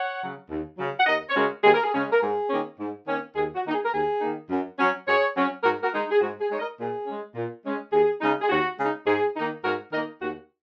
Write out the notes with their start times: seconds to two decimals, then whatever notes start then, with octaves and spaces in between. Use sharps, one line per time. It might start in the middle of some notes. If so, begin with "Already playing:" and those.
Already playing: C#5 F#5
0.22 C#3 F#3
0.50 D#2
0.78 C#3 F#3
0.99 F#5
1.07 D#2 A#4 D#5
1.30 C#5
1.35 C#3 G#3 C#4 F#4 A#4
1.64 D#2 G#4
1.74 A#4
1.84 G#4
1.93 C#3 G#3 C#4
2.12 A#4
2.22 G#2 G#4
2.50 D#3 A#3 C#4
2.79 G#2
3.07 D#3 A#3 C#4
3.36 D#2 G#4
3.55 F#4
3.65 D#3 A#3 D#4
3.74 G#4
3.85 A#4
3.93 D#2 G#4
4.21 D#3 A#3 D#4
4.50 F#2
4.79 F#3 C#4
5.06 F#2 G#4 C#5
5.35 F#3 C#4
5.64 G#2 F#4 A#4
5.83 F#4 A#4
5.93 G#3 D#4
6.11 G#4
6.21 G#2 F#4
6.40 G#4
6.50 G#3 D#4 C#5
6.59 A#4 D#5
6.79 A#2 G#4
7.07 G#3 C#4
7.35 A#2
7.64 G#3 C#4
7.93 D#2 G#4
8.21 C#3 G#3 D#4
8.42 G#4
8.50 D#2 F#4
8.79 C#3 G#3 D#4
9.06 G#2 G#4
9.36 D#3 A#3 D#4
9.64 G#2 F#4 A#4
9.92 D#3 A#3 D#4 A#4 D#5
10.21 D#2 F#4